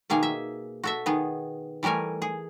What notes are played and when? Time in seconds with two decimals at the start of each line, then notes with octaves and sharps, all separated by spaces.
0.10 B2 D#3 A#3 G#4 G#5
0.23 E5
0.84 F#4 A4 E5
1.06 D#3 B3 G#4
1.83 E3 G3 A3 A#4 G#5
2.22 G#4